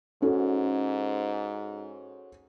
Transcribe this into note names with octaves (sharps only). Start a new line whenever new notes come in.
G#2 C#4 F#4 A4